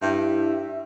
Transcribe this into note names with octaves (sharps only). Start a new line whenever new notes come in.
G2 E4 E5